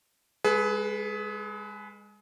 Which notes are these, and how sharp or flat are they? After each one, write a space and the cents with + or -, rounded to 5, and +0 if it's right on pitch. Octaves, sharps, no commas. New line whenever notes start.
G#3 -25 G#4 +35 B4 +0